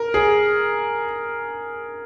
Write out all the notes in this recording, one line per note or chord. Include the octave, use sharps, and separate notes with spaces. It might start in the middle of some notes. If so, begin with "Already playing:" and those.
Already playing: A#4
G#4